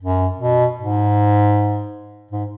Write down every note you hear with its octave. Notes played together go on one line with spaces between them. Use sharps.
F#2
B2
G#2
G#2